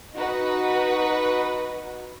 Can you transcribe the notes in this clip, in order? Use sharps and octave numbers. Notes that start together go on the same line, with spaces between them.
D#4 F#4 B4